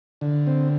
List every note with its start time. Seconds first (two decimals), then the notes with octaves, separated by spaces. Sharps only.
0.21 D3
0.47 C4